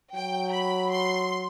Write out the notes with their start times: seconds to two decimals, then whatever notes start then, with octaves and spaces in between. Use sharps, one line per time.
0.15 F#3 G5
0.53 B5
0.91 C6